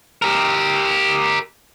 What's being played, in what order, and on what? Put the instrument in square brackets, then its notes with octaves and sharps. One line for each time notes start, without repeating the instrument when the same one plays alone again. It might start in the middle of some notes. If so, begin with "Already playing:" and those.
[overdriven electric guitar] G4 A#4